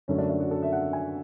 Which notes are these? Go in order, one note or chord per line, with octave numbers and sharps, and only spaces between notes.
F#2 D3 F#3 A3 C#4
D4
D4
F#4
A4
E5
F#5
G#5